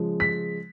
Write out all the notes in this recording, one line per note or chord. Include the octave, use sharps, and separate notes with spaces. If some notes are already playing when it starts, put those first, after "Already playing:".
Already playing: C#3 F3 G#3
B6